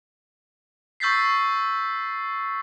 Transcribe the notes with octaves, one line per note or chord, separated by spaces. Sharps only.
C#6 E6 G6 A6 B6 C7